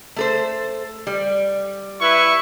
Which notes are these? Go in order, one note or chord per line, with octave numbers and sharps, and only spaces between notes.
A3 A4 C5
G3
E4 B4 C#6